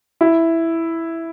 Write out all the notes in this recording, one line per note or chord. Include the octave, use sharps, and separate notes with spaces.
E4